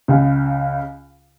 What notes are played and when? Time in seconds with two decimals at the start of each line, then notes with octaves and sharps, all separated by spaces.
0.08 C#2 C#3